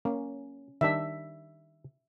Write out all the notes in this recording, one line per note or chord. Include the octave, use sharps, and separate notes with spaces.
A#3 C#4
D#3 G3 D4 E5